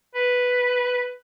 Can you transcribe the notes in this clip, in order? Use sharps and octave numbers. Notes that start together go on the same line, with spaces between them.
B4